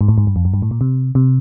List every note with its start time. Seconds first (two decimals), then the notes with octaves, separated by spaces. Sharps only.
0.01 G#2
0.09 A2
0.18 G#2
0.27 G2
0.36 F2
0.45 F#2
0.54 G2
0.62 A2
0.71 A#2
0.81 C3
1.15 C3